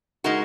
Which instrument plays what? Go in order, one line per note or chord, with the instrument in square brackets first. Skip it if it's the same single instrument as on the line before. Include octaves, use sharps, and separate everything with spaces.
[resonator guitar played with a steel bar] G#3 D#4 F#4 A#4